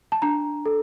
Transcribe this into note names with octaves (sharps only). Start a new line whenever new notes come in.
A5
D4 A#5
A4